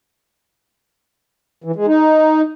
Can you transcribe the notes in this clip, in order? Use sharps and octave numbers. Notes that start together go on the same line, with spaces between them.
E3
G#3
D#4